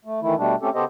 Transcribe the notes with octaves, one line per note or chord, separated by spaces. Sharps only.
A3
D#3 E3 A3 E4
B2 G3 A3 D4
A3 C4 C#4 G4 A4
C#3 B3 G4 A4 C5 D#5